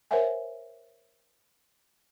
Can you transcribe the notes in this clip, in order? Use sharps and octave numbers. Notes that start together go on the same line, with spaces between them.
A#4 C5 C#5 E5 F#5 G#5